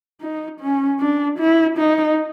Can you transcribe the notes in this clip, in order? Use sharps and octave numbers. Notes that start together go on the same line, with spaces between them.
D#4
C#4
D4
E4
D#4